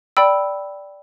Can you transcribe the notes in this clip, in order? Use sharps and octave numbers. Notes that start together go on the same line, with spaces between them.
D5 G5 B5 E6